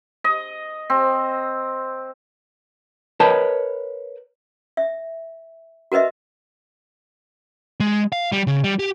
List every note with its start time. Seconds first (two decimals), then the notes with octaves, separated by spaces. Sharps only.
0.24 D#5
0.90 C4
3.20 A#4 B4 C#5 D#5 G5 A5
4.77 E5
5.92 F#4 A#4 B4 D#5 E5
7.80 G#3
8.12 F5
8.32 G3
8.47 C#3
8.64 G3
8.79 G4